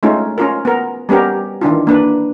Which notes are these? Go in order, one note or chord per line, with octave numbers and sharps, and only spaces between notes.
G#3 A3 C#4 D#4 F4
C#4 F4 A#4
B3 A#4
G3 B3 C#4 G4 A#4
D#3 E3 D4 F4
A#3 D4 B4